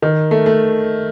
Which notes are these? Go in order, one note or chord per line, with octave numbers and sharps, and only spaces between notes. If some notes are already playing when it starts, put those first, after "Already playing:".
D#3
A3
A3